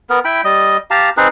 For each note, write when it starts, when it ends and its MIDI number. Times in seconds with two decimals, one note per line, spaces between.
0.10 0.20 59
0.10 0.20 70
0.25 0.41 64
0.25 0.41 79
0.25 0.41 83
0.44 0.77 55
0.44 0.77 75
0.91 1.10 67
0.91 1.10 77
0.91 1.10 81
0.91 1.10 82
1.17 1.28 60
1.17 1.28 63
1.17 1.28 68
1.17 1.28 71